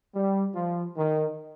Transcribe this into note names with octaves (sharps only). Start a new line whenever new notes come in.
G3
F3
D#3